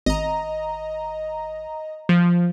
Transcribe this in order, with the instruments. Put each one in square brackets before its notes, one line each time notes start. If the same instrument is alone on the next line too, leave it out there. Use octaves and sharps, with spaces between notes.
[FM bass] G#1 [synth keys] D#5 A#5
[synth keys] F3